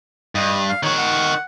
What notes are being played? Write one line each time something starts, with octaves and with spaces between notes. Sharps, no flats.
G2 D#5
F5
D#3 F#4 C#5
F#5